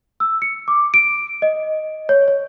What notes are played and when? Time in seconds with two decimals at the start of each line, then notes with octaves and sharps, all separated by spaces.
0.20 E6
0.42 C#7
0.68 D6
0.94 D7
1.42 D#5
2.09 C#5
2.28 C#5